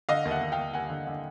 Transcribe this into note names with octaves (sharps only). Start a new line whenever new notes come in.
D3 D#5 F5
D#2
E5 F#5
D#2
F5 G5
D#2
D#2 F#5 G#5
D3
D3